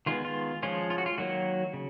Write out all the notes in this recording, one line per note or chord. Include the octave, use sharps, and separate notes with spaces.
D#3 G#3 B3 F4
F4
F3 G#3 C#4 F4
F4
F#4
F4
D#3 F#3 A#3 F#4
C#3